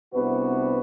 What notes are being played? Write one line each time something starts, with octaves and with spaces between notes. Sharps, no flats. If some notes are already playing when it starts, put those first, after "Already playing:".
C2 C3 B3 D4 F#4 B4